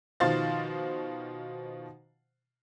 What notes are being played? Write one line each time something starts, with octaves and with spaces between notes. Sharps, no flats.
B2 D#3 F3 C5 F5 A6